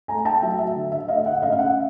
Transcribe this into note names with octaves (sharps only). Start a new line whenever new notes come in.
A3 G#5 A#5
G5 A5
F#3 E5
E5
D3
E5
A3 D#5 F5
E5 F#5
C#4 D#5 F5
F5
E5 F#5